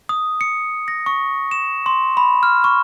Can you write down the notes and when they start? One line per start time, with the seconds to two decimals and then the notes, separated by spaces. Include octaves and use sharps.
0.09 D#6
0.41 C#7
0.88 A#6
1.06 C#6
1.51 E7
1.86 C6
2.17 B5
2.43 F6
2.64 C#6